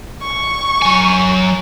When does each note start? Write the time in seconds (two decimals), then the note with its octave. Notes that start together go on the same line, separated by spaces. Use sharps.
0.22 C#6
0.82 F#3 G#5